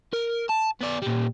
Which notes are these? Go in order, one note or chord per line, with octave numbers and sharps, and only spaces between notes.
A#4
A5
B3 D5
A#2 G3